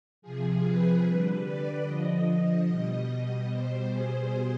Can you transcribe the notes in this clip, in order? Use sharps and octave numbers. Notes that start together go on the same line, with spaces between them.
C3 F3 G#4
B4
D3 G3 B4
D5
D3 F3 D#5
B2 G3
B2 G3 C5
G#4